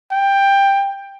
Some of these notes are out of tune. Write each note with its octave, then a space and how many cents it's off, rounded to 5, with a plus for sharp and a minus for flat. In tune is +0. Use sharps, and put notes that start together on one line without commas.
G5 +10